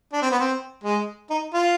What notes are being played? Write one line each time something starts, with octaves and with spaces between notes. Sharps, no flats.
D4
C4
B3
C4
G#3
D#4
F4